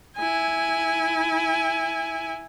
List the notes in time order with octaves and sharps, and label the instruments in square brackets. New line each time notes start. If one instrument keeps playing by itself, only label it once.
[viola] E4 G#5